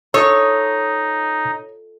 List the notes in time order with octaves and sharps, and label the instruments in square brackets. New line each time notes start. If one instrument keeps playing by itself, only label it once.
[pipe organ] D#4 [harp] F4 A4 D#5 [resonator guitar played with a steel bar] C#5 [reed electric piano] D#6 E6